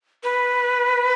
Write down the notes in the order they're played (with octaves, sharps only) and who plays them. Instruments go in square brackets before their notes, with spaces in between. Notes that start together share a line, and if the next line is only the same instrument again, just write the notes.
[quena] B4